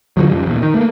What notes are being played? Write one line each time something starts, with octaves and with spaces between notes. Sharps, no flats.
G2 D3 F3 F#3
F2 C#3 F3 G3
D#1 A#1 E2
D#3
A3 A#3